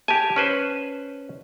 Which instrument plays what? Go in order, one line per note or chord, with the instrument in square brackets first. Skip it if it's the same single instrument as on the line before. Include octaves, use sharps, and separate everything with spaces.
[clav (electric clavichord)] G4 G#5 [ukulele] A5
[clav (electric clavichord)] C#4 B4 C5